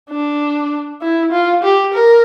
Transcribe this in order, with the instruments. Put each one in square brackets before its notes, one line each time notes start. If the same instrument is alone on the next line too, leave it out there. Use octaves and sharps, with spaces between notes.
[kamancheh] D4
E4
F4
G4
A#4